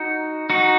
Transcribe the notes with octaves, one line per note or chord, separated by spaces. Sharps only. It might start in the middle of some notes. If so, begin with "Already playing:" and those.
Already playing: D#4 F#4
D#4 F#4